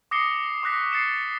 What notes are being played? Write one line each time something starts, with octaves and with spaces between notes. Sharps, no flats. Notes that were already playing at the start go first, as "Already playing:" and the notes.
D6 D#6 A#6 C7 C#7 G7
C#6 D6 F#6 A#6 B6
A6 C7 C#7 E7